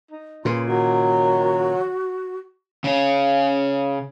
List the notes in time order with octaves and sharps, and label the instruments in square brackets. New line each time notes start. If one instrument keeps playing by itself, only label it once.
[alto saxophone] D#4
[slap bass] A#2 C#3 [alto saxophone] B4 [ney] C6
[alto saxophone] D#3 [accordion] F#3 [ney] F#4
[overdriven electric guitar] C#3 C#4